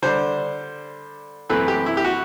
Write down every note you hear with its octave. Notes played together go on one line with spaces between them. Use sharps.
D3 G3 D4 C5
F#2 E3 A3 C4 B4
G4
E4
G4
F#4